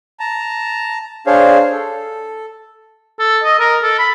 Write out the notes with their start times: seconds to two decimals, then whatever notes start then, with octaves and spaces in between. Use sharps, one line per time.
0.20 A5 A#5
1.27 D4 G#4 C5 C#5 F5
1.72 A4
3.19 A4
3.44 D#5
3.60 A#4
3.83 A4
3.99 B5